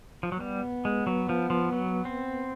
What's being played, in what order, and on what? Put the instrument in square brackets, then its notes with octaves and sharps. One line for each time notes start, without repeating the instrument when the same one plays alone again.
[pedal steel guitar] F3
F#3
[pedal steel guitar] G3 [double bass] B3
[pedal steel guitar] G#3
F#3
F3
F3
F#3
C4